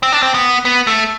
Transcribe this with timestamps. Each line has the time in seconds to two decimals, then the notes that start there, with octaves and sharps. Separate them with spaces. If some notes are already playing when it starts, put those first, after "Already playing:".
0.03 C4
0.12 D4
0.23 C4
0.35 B3
0.65 B3
0.87 A3